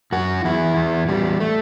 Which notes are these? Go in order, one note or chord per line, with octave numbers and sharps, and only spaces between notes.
F#2 F#4
E2 E4
E2
E2 G3
A3